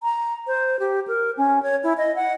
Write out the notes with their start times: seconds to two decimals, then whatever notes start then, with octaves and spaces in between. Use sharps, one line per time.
0.03 A#5
0.47 C5
0.80 G4
1.08 A#4
1.37 C#4
1.63 C#5
1.84 E4
1.98 D#5
2.16 F#5